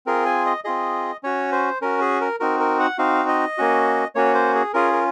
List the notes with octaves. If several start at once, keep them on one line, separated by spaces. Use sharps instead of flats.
C4 F4 G#4 A#4
G#5
D#5
C4 F4 G#4 D#5
C#4 F#4 C#5
C5
C#4 F#4 A#4
G#4
A#4
C4 D#4 F#4 A#4
A#4
F#5
C4 D#4 F#4 F5
D#5
A#3 C#4 F#4
A#3 C#4 F#4 C#5
C5
G#4
C#4 F4 G#4 A#4
A#4